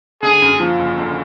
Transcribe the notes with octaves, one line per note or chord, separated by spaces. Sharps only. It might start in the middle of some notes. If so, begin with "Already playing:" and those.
D3 G#4
F#2
F3
F#1
D3